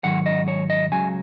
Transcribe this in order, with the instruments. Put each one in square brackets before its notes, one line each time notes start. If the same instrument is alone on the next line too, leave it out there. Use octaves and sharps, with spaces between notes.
[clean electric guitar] G#2 D#3 F#3 F#5
D#5
C#5
D#5
C#2 C#3 F#3 G#5